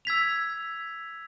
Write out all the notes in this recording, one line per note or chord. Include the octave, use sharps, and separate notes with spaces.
E6 G#6 B6 F7